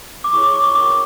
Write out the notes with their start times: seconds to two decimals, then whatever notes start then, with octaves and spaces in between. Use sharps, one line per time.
0.24 D6
0.33 E4 G#4 C#5 C#6
0.43 D6
0.54 D6
0.64 C#6
0.74 C#4 F#4 A#4 C#5 D6